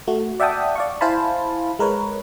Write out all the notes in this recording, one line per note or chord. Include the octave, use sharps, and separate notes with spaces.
A3 F#4
D5 E5 F#5 G5 A5 D#6
D5 F5 C#6
E4 C5 F5 G#5 A5 B5
G#3 A#4 B4 C#5